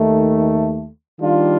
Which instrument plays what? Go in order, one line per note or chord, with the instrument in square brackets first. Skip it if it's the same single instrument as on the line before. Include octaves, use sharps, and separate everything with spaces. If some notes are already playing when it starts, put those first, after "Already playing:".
Already playing: [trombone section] D#2 D#3 A3
D#3 G3 D4 F4